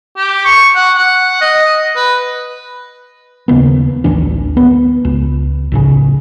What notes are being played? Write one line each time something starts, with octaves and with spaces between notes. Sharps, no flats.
G4
C#6
F#5
F#5
D#5
B4
D#2 C#3 A#3 B3
A1 D2 E3 D4
B3
C#2
A#1 A2 C#3